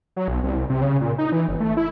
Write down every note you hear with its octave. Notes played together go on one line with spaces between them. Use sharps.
F#3
B1
C2
C3
C#3
A#2
D#4
E3
G1
A3
E4